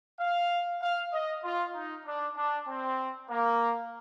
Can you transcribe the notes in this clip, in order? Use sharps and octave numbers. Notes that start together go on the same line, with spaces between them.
F5
F5
D#5
F4
D#4
D4
D4
C4
A#3